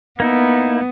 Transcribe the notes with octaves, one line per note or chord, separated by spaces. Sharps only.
A#3 B3 D#4 E4